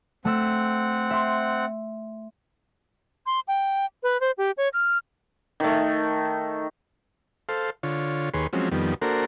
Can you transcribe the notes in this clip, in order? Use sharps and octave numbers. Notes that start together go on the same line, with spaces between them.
A3 C4 F#5 E6
E5 C6
C6
G5
B4
C5
G4
C#5
F6
D#3 A3
A4 C5 F5
D3 F4 C#5
D#2 G#4 B4 C#5 C6
F3 F#3 G#3 C4 C#4
F2 D#3 G3 B3
A#3 D4 F#4 A4 A#4 C5